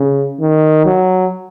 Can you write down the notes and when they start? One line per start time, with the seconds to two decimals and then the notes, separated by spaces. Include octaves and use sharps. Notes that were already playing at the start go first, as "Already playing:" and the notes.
Already playing: C#3
0.40 D#3
0.86 F#3